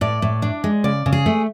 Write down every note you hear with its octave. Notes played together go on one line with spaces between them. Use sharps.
A2 D5
A2
D4
G#3
C#3 D5
C#3
G#4
A3